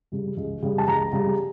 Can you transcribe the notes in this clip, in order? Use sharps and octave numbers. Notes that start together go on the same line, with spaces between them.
C#3 G3
C#2
C#3 G3
A5
C#2 A#5
C#3 G3